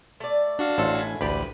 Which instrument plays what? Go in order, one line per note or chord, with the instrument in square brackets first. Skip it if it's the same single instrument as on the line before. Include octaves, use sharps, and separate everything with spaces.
[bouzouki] A3 D5
[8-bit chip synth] D4 F#4 F5
[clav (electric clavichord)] A1 A4 [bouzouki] C5
[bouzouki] E4 G#5
[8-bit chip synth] A1 B5 [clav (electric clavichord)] D2 G4 D5 [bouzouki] B4